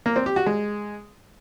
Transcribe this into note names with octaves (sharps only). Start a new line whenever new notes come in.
A#3
C4
G4
F#4
G#3